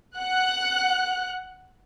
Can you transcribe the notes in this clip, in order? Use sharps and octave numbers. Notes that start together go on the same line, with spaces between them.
F#5 F#6